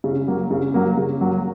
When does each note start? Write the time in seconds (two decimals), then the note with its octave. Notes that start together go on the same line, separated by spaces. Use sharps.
0.04 C#3
0.28 F#3 A#3
0.51 C#3
0.74 F#3 A#3
0.97 C#3
1.21 F#3 A#3